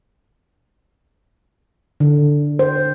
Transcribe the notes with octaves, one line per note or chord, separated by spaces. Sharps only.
D3
C5